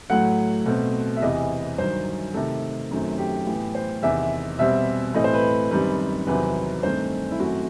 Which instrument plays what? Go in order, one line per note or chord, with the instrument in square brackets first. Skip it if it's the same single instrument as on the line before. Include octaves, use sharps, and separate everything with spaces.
[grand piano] A2 F#3 A3 F#5
B2 A3 C4
E5
E2 C3 E3 D#5
G2 D#3 F#3 C5
C3 D#3 A3 A4
F#2 D#3 F#3 A3 C4
G4
A2 E3 B3
C5
E2 C3 D#3 E5
B2 G3 C4 E5
A2 E3 A3 C4 D#5
C5
B4
F#2 D#3 G3 C4 B4
E2 C3 D#3 F#3 C4 B4
G2 D#3 A3 C4 C5
E4
F#2 D#3 A3 C4 F#4